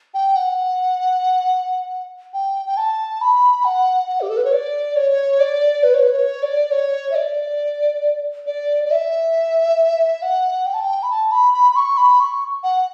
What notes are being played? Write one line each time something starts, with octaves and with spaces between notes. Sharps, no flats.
G5
F#5
G5
G5
A5
B5
F#5
F#5
G4
A4
B4
C#5
D5
C#5
D5
B4
C#5
B4
C#5
D5
C#5
E5
D5
D5
D5
E5
F#5
G5
A5
G5
B5
A5
B5
B5
B5
C#6
B5
C#6
F#5